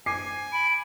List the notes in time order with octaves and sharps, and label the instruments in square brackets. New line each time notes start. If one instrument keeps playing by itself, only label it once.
[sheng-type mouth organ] G#5 [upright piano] D6 C7
[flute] B5 [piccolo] D7